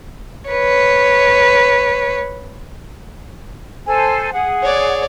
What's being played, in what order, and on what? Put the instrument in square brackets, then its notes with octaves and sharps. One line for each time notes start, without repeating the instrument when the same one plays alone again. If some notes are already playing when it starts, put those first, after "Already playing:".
[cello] B4 C#5
[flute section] A4 C5 G#5
G#4 F#5
[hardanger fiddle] C#5 D5